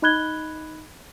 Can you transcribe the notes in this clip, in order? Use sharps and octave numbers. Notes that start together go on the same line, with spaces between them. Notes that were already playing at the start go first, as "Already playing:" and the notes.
D#4 D#5 B5 F#6 G#6 G7